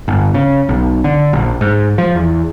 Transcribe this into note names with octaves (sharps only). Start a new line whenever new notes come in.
G1
C#3
B1
D3
A#1
G#2
F3
E2